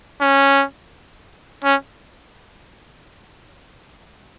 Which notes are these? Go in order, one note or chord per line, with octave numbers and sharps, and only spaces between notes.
C#4
C#4